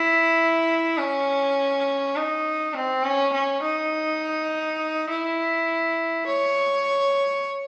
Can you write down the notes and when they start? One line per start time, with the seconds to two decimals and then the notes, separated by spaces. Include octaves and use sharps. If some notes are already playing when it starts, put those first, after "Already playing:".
Already playing: E4
0.98 C#4
2.16 D#4
2.74 C4
3.03 C#4
3.33 C#4
3.62 D#4
5.09 E4
6.26 C#5